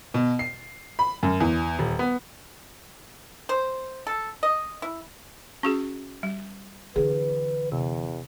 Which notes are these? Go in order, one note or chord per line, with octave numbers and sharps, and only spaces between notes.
B2
C7
B5
F#2
E2
D#1
B3
C5
A4
D#5
E4
C#4 F#4 G#4 C#6
G3
D3 E3 G#4 B4
E2 C3